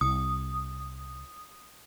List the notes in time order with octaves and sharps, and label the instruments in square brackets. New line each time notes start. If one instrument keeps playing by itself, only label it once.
[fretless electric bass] C2 [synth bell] D#6